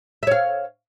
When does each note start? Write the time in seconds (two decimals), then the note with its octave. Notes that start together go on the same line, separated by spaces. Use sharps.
0.23 E5
0.27 C#5
0.31 F5